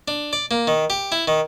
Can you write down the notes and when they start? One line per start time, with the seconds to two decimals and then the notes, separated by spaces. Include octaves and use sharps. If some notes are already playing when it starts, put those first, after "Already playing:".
0.08 D4
0.33 D5
0.51 A#3
0.67 D#3
0.90 G4
1.12 E4
1.28 D#3